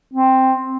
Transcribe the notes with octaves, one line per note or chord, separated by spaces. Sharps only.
C4